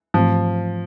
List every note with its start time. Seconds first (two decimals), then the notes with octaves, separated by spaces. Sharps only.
0.14 G#2 E3 F3 A3 C4